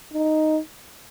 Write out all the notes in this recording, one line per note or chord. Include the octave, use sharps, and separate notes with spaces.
D#4